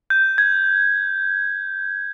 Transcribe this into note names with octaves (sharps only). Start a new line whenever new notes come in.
G6
G#6